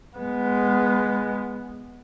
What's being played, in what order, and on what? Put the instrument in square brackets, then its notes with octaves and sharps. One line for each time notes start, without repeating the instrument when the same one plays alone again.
[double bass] G#3 B3